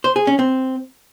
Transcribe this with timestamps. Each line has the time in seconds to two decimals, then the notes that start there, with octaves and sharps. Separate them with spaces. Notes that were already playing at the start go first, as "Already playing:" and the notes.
0.04 C5
0.16 G#4
0.27 C#4
0.39 C4